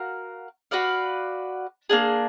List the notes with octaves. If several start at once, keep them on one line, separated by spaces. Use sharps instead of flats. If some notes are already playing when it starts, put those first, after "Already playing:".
Already playing: F#4 A#4 F5
F#4 B4 D5 F5
A#3 D4 G#4